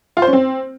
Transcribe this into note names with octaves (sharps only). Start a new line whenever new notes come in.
F4
C5
C#4
C4